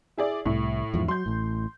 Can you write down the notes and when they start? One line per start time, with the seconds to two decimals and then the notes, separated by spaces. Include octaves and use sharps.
0.17 E4 G#4 D5
0.46 C2 A2
0.94 E2 G#2 F3
1.08 F#3 C6 G6
1.26 A1 A2